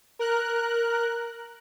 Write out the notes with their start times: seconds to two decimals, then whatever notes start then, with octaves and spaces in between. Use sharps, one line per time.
0.19 A#4 F#6